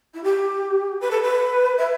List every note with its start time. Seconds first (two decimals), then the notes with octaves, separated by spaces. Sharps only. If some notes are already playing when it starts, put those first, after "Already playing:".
0.14 E4
0.24 G4
1.01 B4
1.11 A4
1.22 B4
1.78 E5